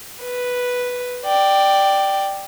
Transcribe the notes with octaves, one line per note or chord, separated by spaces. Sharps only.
B4
D5 G5